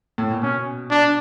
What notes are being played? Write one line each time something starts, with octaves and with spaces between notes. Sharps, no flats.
A2
A#2
B2 C#4
D4